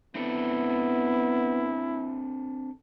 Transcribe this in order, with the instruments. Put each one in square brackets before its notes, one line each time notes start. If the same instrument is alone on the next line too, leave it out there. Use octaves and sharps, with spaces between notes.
[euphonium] B3 [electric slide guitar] C4 D4 A4 [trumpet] E4